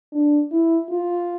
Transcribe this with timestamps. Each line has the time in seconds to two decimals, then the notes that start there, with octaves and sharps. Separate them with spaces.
0.12 D4
0.51 E4
0.89 F4